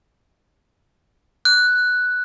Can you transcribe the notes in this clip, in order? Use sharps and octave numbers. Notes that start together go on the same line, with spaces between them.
F#6